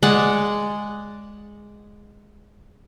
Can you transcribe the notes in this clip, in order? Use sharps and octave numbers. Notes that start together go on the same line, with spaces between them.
G#3 D5 F#5